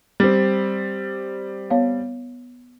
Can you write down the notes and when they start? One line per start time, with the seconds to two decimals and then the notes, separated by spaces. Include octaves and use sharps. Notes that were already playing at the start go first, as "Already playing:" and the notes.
0.20 G3 C4
1.70 B3 C#5 F5